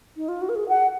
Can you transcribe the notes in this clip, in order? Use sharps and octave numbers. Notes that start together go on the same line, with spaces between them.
D#4
F4
F#4
A#4
G#4
F#5